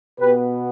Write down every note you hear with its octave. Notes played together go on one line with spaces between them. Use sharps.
B2 B3 G4 B4